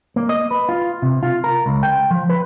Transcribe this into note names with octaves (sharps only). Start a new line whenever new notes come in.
A#3
D#5
B4
F4
C3
F4
A#4
C#2
G5
F3
B4